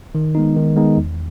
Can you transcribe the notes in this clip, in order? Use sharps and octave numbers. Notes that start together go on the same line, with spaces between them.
D#3
G#3 B3 D#4
D#3
G#3 B3 D#4
E2